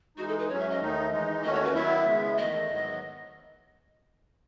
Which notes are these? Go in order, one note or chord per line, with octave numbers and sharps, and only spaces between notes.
E3 G#3 D#4 F#4
A4
B4
G#2 F#3 C#4 C#5
E5
D#5
D#2 D#3 A3 D#4
E3 G#3 D#4
D#2 D#3 A3 C#4 F#4 D#5
C#5
B4
D#3 F#3 B3 E4 E5
C#3 G#3 B3
E2 D#3 A3 D#5
G#2 D#3 F#3 B3